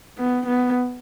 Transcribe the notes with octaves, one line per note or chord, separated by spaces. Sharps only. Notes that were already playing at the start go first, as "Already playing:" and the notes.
B3
B3